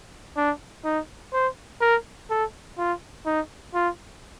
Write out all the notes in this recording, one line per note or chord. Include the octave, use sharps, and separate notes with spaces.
D4
D#4
C5
A#4
A4
F4
D#4
F4